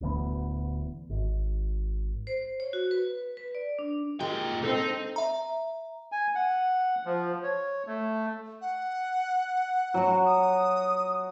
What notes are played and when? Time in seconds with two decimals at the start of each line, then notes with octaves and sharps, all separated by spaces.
0.01 D1 D2 E3 B3
1.09 G#1
2.27 C5
2.60 C#5
2.73 F#4
2.91 B4
3.37 B4
3.55 D5
3.79 D4
4.20 A#2 G#3 G4 A#4 G5
4.64 C4 D#4 A4
5.16 E5 A#5
6.12 G#5
6.35 F#5
7.05 F3
7.43 C#5
7.87 A3
8.61 F#5
9.94 F#3 F#4
10.25 D#6